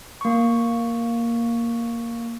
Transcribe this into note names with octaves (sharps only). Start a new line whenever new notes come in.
A#3 C#6